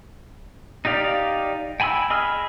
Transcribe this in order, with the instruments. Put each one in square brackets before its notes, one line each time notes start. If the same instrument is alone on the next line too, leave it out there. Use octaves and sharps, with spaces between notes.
[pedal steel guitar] D#4 G4 D5 F5
G5 G#5 B5 C6 E6
G#4 D#5 B5 E6 F6